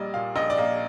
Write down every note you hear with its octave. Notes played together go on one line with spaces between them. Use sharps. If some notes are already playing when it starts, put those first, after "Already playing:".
Already playing: A#1 G3 A#3 D5 D#5
A#2 F5
A#1 D#5
D5
A#3 D#5